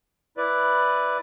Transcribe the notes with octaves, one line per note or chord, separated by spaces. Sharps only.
E4 B4 D5